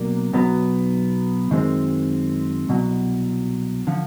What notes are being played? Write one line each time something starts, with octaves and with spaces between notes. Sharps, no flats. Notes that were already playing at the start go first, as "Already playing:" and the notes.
Already playing: B2 F#3 A#3 D4
B1 B2 F#3 B3
F#2 D#3 G#3 C4
C2 B2 F#3
D3 F3